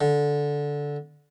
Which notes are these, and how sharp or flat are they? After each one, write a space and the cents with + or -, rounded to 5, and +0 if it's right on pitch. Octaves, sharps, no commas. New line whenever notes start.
D3 -10